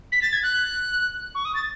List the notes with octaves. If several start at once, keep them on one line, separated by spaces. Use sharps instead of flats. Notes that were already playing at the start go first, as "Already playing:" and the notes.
B6
A6
G#6
F#6
C#6
D#6
A6